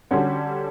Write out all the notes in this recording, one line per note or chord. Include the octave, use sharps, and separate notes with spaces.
D3 G3 C#4 F#4